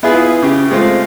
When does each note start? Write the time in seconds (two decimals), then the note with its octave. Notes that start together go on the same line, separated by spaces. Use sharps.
0.03 B3 E4 F4 G#4 B4
0.43 C#3 G4
0.71 G#3 A3 C4 F4